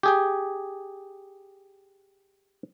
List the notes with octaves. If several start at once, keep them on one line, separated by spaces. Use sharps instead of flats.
G4 G#4 G5